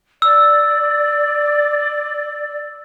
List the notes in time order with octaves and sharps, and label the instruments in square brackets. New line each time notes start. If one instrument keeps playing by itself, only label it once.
[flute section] D5 [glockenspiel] E6